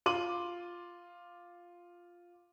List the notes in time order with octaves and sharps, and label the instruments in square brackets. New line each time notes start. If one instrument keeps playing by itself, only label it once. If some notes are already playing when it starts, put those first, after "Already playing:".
[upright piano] F4 C6 D6 D#7 F#7